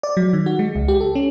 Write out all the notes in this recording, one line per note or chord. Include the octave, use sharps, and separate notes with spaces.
D5
F#3
D#3
F#4
G#3
C#2
G4
A4
C#4